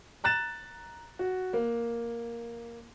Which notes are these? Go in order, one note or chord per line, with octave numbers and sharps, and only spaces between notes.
A#5 F#6 A6 E7
F#4
A#3